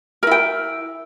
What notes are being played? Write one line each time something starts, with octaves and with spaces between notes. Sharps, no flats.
E4 A#4 G5